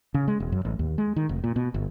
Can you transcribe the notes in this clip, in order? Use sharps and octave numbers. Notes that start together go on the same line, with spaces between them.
C#3
G#3
E1
F#2
A1
D#2
G#3
D#3
F1
A#2
B2
G1